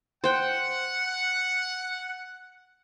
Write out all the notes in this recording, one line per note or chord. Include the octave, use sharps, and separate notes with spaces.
C5 F#5 G5